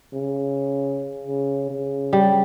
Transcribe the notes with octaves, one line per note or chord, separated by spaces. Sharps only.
C#3
C#3
C#3
G3